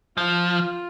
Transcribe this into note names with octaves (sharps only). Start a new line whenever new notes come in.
F3 F4